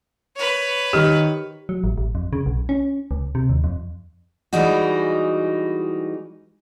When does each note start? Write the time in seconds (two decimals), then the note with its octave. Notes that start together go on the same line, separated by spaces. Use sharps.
0.36 B4 C#5
0.93 D#3 D#4 G4 F6
1.69 F#3
1.84 A1
1.98 A1
2.15 F2
2.33 C#3
2.46 B1
2.69 C#4
3.11 C#2
3.35 C3
3.49 D#2
3.64 F2
4.53 E3 G3 G#3 D#4 F#4